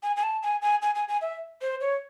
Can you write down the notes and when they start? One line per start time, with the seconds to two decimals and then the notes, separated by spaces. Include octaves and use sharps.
0.03 G#5
0.16 G#5
0.23 A5
0.43 G#5
0.62 G#5
0.82 G#5
0.95 G#5
1.08 G#5
1.21 E5
1.62 C5
1.81 C#5